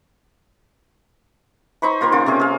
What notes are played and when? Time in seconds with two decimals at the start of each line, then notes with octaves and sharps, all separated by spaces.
1.82 D#4 C5 B5 C#6
2.01 D#3 A#3 F4 C6
2.12 C#3 F4 D6
2.26 C3 C#4 G#4 G5
2.40 G#4 F5